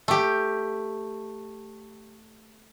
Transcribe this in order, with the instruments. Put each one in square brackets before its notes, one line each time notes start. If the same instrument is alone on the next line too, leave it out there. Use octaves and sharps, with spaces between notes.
[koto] A3 G4